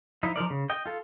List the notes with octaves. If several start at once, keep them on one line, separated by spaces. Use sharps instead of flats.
F3 D#4 E4
F3 D#4 A#4 D5
C#3
D#5 G5
F4 A4